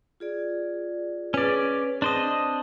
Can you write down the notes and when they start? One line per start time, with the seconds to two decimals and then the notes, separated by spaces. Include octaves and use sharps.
0.20 F4 G#4 D5
1.34 C#4 G#4 B4 D5
2.02 C4 D4 C5 D#5 A5